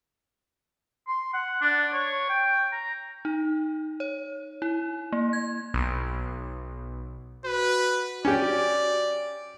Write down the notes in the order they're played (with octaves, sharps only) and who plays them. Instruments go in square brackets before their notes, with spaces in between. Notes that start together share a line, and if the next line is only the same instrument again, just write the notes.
[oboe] C6
F#5
D4
C#5
G5
A#5
[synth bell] D#4
C#5
E4
A#3
G#6
[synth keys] B1
[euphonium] F#4 [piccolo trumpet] B4
[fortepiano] C#4 G4 [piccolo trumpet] D5